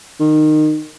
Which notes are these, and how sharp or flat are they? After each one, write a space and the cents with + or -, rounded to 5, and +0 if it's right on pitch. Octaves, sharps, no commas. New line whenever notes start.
D#3 -20